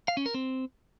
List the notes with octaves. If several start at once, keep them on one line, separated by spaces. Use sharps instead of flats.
F5
C#4
A#4
C4